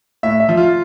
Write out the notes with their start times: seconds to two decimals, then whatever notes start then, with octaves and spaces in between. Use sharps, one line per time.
0.23 A2 E5
0.40 E5
0.49 F3
0.57 F4